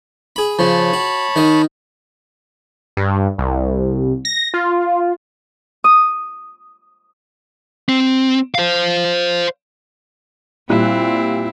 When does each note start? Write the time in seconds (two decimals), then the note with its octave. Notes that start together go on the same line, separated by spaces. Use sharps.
0.36 G#4 B5
0.59 C#3 F3 C#5 A5 B5
0.93 F#4
1.36 D#3 A#4 D#5
2.97 G2
3.38 C2
4.25 A#6
4.54 F4
5.84 D#6
7.89 C4
8.55 C5 F5
10.70 A#2 G3 C4 E4 F#6